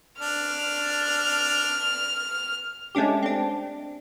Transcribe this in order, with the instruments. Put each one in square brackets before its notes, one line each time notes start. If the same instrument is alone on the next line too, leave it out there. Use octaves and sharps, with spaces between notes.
[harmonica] D4 [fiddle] F6
[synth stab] G#3 A3 C#4 D4 G4
C4 D4